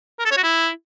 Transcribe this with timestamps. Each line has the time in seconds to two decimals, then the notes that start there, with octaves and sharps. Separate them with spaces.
0.19 A#4
0.25 A4
0.31 C#5
0.37 F#4
0.44 E4